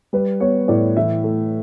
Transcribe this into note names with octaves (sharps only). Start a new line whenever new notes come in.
G3 B4
B3 C#5
A2 D5
E3 E5
A3